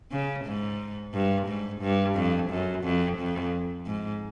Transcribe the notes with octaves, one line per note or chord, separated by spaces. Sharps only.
C#3
G#2
G2
G#2
G2
F2
F#2
F2
F2
G#2